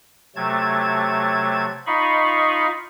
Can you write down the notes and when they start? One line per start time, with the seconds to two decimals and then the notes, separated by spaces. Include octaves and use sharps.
0.36 C3 F#3 A3 A5 G#6
1.86 D#4 F4 D#5 F5 B5 C#6